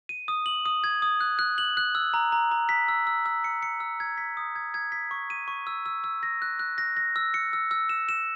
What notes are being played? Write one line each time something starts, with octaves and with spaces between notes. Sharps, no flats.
D#7
D#6
F#7
D#6
G#6
D#6
F#6
F#6
F#7
F#6
E6
A#5
A#5
A#5
B6
E6
E6
E6
C#7
C#7
E6
G#6
B6
D#6
G#6
G#6
B6
C#6
D#7
C#6
E6
E6
E6
A#6
F#6
F#6
A#6
A#6
E6
C#7
E6
E6
E7
E7